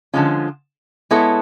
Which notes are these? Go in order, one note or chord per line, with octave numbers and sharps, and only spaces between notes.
D3 F3 G#3 C#4 F4
G#3 B3 E4 A4 C#5